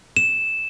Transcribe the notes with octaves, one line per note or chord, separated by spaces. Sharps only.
E7